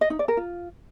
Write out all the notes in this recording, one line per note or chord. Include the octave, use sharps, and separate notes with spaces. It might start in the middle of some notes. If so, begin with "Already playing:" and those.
D#5
D#4
D5
A#4
F4